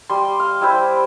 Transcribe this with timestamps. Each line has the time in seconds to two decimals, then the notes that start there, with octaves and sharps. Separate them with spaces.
0.10 G3 C6
0.40 F5
0.61 G3 E4 C5